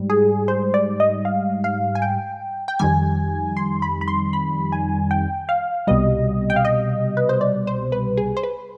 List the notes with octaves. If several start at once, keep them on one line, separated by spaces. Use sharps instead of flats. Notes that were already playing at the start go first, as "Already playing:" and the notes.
Already playing: G#2 G3
G#4
C5
D5
D#5
F5
F5
G#5
G5
G5
F2 D#3 G3 G#5
C6
B5
B5
C6
B5
G#5
G5
F5
C2 B2 G3 D#5
G5
F5
D#5
B4
C5
D5
C5
B4
G#4
C5
B4